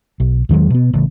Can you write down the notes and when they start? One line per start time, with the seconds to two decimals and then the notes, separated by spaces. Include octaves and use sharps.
0.20 B1
0.49 E2 D#3 F#3 G#3
0.70 B2 B3
0.93 A1 C#3